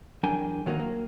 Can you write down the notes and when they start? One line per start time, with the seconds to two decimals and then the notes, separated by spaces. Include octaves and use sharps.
0.23 E2 F#3 D4 A#4 G5 G#5
0.66 D#3 F#3 A#3 C#4 D#4
0.80 A#3